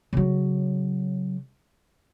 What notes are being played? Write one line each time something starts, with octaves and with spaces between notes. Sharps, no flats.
C#3 F#3